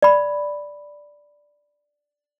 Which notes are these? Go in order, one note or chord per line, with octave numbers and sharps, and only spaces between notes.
D5 B5